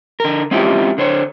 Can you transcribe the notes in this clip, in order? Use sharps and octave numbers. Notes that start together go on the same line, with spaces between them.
D3 A#4
G#3 C4 C#4 E4 F4 G4
D3 C5 C#5